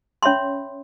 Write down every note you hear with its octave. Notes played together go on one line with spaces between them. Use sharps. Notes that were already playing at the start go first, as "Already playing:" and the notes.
C#4 C#5 E5 B5 C6